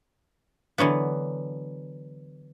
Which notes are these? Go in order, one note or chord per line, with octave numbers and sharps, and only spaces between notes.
D3 E3 F#3 B3